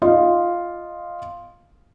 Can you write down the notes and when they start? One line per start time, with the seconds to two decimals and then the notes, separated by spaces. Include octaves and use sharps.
0.02 F4 D#5